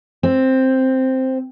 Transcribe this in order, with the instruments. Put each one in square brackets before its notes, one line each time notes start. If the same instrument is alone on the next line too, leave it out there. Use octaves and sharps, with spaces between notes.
[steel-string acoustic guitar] C4